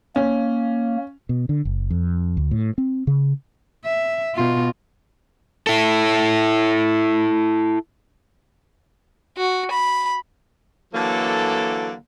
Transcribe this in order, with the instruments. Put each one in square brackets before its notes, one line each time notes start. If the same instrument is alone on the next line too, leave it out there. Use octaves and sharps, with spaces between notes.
[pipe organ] A#3 [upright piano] C#4
[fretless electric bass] B2
D3
F#1
F2
D2
A2
C4
C#3
[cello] E5
B2 F4
[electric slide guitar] E4 A4
[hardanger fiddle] F#4
B5
[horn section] D3 E3 F#3 A#3 A4